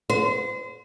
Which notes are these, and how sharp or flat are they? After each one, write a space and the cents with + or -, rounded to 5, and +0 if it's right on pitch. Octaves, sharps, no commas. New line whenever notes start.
C5 -35